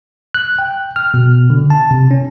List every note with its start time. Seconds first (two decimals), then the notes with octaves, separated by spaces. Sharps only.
0.34 F#6
0.59 G5
0.96 F6
1.14 B2
1.50 D3
1.70 A5
1.91 C3
2.11 C#4